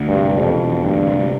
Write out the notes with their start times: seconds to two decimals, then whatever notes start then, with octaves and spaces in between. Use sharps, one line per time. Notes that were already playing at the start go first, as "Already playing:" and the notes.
Already playing: D2
0.08 G2
0.15 C3
0.38 E1 F2
0.61 E1
0.83 D2 G2
1.07 C3